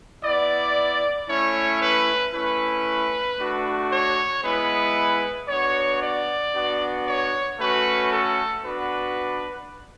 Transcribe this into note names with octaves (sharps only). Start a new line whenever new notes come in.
B3 E4 D5
A3 C#4 E4 C#5
B4
A3 C#4 E4 B4
A3 D4 F#4
C#5
G#3 B3 E4 B4
B3 D4 F#4 C#5
D5
B3 D4 F#4
C#5
A3 C#4 F#4 B4
A4
B3 D4 F#4 B4